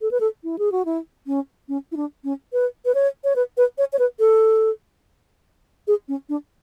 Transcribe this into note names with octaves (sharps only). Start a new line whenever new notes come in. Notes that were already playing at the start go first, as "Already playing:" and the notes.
A4
B4
A4
E4
G#4
F#4
E4
C#4
C#4
E4
D4
C#4
B4
B4
C#5
C#5
B4
B4
C#5
C#5
B4
A4
G#4
C#4
D4